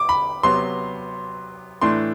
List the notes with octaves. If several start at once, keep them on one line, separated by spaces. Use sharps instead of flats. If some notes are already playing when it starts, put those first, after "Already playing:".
Already playing: D6
B5
C3 F#3 B3 C6
A2 E3 A3 D4 C6